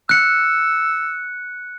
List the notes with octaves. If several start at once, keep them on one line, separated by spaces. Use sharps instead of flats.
E6 F#6 C#7